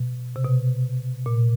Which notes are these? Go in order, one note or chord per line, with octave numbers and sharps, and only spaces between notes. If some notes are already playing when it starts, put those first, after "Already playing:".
Already playing: B2
C3
B2
A#2